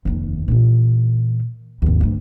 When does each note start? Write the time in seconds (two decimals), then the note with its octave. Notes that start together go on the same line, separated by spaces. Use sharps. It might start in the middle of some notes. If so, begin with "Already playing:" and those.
0.05 F1 D#2
0.48 A#2 E3
1.82 G#1 D#2
2.01 D2 G2